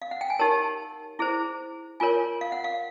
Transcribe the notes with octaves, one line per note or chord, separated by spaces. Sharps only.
F5
F#5
G5
G#5
D#4 G4 A#4 C#5 A5
E4 G#4 C5
F4 A#4 C#5 G#5
F5
F#5
F5